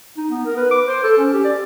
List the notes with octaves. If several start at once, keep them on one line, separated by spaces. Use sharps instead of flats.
D#4
B3
A#4
B4
D6
C5
A4
C#4
G4
D5